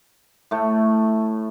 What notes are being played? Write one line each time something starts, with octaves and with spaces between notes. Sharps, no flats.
A2 A3